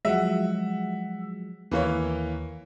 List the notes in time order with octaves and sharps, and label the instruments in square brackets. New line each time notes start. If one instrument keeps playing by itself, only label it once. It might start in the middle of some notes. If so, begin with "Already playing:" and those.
[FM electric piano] F3 F#3 G#3 [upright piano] E5 F#5
[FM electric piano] D#2 [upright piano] E3 A#3 C#5